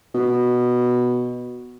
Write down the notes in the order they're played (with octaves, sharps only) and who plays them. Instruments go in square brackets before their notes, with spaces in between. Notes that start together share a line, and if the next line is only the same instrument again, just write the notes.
[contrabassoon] B2